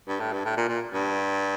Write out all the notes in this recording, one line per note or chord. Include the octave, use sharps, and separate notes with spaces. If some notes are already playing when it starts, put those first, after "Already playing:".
G2
A2
G2
A2
A#2
A#2
G2